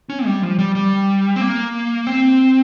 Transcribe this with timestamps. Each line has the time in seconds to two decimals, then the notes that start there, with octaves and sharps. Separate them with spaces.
0.10 C#4
0.26 G3
0.43 F3
0.59 G3
0.75 G3
1.36 C4
1.41 A#3
2.07 C4